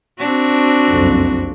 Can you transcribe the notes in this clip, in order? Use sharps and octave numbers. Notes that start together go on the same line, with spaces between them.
C4 D4 F#4
F#1 C2 F2